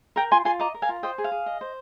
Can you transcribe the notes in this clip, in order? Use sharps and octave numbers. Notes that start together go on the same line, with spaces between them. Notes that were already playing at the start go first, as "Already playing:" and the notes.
A#4 G5 A#5
F4 G#5 C6
F4 G#5 C6
D#5 A#5 D6
A#4
F5 G#5
F4
C5 D#5 G5
G#4
F5
G#4
D#5
C5